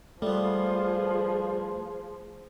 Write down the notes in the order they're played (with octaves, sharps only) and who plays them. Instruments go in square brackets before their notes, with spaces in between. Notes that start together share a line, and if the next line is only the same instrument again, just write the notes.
[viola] F3 G#4 [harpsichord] G3 B3 [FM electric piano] A3 [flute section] F4 B4